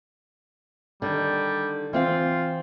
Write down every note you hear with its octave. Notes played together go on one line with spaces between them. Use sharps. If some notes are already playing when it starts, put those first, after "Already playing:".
D3 D#3 G3
E3 C4 F4 F5